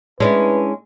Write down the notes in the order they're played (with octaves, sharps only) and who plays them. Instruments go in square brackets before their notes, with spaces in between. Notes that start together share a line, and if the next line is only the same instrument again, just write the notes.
[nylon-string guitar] G#3 [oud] C#4 D4 E4 [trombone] B4